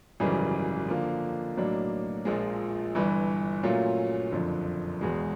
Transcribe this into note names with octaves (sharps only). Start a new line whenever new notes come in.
G#1 F#2 C#3 E3 G3
D3 F3 A#3
B1 A2 F#3 A#3 D4
A#1 A#2 F3 G#3
G1 G2 E3
A#2 F#3 A3 C#4 F4
F#1 F2 D3 F3
E1 E2 B2 G#3